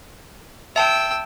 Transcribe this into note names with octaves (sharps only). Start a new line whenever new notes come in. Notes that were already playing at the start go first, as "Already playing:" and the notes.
E5 G5 A5 E6